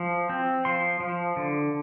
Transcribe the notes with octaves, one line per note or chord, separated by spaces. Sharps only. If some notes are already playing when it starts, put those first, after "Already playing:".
Already playing: F3
C4
F3 C6
F3
D3